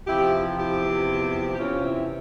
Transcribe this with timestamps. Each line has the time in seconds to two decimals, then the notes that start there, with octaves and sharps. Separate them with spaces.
0.07 E2 C3 F3 E4 G4
0.57 E4 G4
0.82 E2 C3 F3
1.51 G4
1.58 E2 C3 E3 C#4 F4
1.83 C4 E4